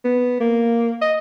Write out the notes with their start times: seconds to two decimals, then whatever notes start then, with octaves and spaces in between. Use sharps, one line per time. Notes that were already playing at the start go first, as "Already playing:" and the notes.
0.05 B3
0.40 A#3
1.01 D#5